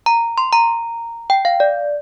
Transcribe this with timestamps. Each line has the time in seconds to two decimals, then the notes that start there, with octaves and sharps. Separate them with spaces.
0.06 A#5
0.38 C6
0.53 A#5
1.30 G5
1.45 F5
1.60 D5